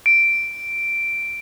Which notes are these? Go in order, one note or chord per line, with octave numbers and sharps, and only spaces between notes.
D7